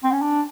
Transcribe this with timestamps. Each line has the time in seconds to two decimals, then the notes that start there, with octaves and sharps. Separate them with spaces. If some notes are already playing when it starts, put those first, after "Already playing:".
0.04 C4
0.12 C#4
0.22 D4